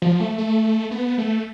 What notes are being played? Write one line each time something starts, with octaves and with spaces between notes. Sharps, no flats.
F3
A3
A3
B3
A3